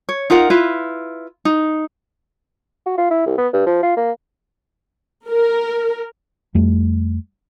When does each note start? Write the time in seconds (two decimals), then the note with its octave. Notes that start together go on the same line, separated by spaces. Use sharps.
0.09 C#5
0.30 D#4 F4 A#4 F#5
0.50 E4 F4 B4
1.45 D#4
2.86 F#4
2.98 F4
3.11 E4
3.26 C2
3.38 B3
3.53 G2
3.67 F3
3.83 F4
3.97 A#3
5.28 A#4
6.55 F2 G3 A3